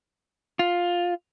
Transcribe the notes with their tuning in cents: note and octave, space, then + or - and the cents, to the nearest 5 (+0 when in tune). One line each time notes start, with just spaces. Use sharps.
F4 +10